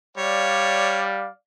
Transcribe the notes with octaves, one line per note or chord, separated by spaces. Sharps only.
G3 C#5 D5 F5